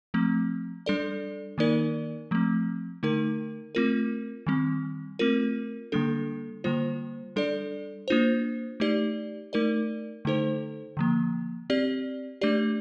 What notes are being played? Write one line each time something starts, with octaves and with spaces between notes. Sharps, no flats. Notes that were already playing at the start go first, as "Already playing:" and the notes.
F3 A3 C4
G3 D4 A4 D5
D#3 A#3 D#4 A#4 D5
F3 A3 C4
D3 A3 D#4 A#4
A3 C4 F4 A#4
D#3 G3 C4
A3 C4 F4 A#4
D3 G3 A#3 D4 A4
D3 G3 A#3 F4 C5
G3 D4 A4 D5
A#3 D4 F4 C5
A3 D#4 G4 D5
A3 D#4 A#4 D5
D3 A3 D#4 A4 C5
D3 F3 A#3
C4 G4 D5
A3 D4 G4 D5